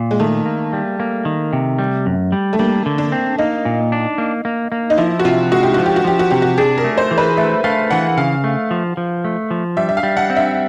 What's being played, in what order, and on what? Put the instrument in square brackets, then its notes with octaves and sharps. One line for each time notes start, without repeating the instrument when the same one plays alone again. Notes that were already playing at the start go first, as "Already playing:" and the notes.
Already playing: [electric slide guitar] A#2
[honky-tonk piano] G#3
[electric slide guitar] D#3 [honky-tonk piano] A3
[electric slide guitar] A#3
G3
A#3
D#3
C3
G3
F#2
G3
[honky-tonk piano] A3
[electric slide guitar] G3 [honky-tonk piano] A#3
[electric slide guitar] D3
[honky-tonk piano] D4
[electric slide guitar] C4
[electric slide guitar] A#3 [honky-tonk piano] D#4
[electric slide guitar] A#2
D4
A#3
A#3
A#3
[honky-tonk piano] D#4
[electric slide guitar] F3 [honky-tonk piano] E4
[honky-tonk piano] F#4
[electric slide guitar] C3 [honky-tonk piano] F4
[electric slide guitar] G#3 [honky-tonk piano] F#4
[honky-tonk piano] G4
[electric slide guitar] F3 [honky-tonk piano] F#4
[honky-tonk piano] G4
F#4
[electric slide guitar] F3 [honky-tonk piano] G4
[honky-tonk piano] F#4
[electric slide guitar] C3 [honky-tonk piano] G4
[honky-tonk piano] F#4
[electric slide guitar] D4 [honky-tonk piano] G#4
[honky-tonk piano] A#4
[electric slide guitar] A3
[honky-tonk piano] C5
[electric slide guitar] E3
[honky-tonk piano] B4
[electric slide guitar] A3 [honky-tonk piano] E5
[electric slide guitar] A3 [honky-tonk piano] F5
[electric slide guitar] E3 [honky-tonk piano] F#5
[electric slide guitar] C#3 [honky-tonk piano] F5
[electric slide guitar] A3
F3
F3
A3
F3
[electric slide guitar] G3 [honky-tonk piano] E5
[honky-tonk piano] E5
F5
[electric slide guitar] G3
[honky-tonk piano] F#5
[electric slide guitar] C4
[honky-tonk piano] E5